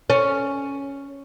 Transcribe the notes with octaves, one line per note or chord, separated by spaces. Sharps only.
C#4